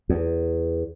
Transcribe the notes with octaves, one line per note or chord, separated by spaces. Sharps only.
E2